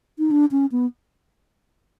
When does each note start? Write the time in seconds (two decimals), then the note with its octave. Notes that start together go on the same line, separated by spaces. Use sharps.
0.19 D#4
0.31 D4
0.52 C#4
0.72 B3